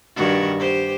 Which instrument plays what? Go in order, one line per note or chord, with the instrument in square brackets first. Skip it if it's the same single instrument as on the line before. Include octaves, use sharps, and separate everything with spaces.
[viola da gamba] G2 D#3 F#4
G4 C5